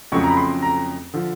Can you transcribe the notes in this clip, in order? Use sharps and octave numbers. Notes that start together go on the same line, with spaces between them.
F2 C#3 F#3 A3 C#6
A#5
B5
C6
A#5
D3 F3